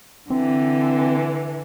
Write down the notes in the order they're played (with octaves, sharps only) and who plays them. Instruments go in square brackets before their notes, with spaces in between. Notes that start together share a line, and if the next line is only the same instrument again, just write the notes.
[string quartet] D3 E3 [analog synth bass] C4